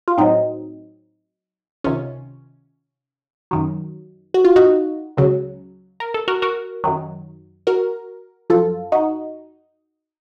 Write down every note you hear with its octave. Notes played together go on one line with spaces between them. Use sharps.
F4
A2 F#3 C4 D#4
C#2 C3 D#3 C#4 F4
F#2 D#3 F#3
F#4
F4
D#4 F#4
C#2 C#3 F#3
A#4
A4
F#4 A#4
F#4 A#4
F#2 D#3 F#3
F#4 A#4
F#2 F3 F4 A4
D#4 F#4